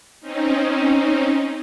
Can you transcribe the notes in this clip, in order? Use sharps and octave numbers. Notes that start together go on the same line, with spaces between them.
C4 C#4 D#4